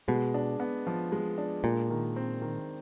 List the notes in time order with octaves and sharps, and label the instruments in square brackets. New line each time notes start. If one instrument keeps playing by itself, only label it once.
[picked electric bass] B2 [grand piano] G#3
[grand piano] D4
B3
F3
G#3
D4
[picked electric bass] A#2 [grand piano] G#3
[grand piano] D#3
C4
D#3